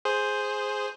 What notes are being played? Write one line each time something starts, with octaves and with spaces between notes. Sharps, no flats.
G#4 C5